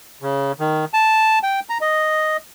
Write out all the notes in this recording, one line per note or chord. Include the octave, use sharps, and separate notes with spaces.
C#3
D#3
A5
G5
A#5
D#5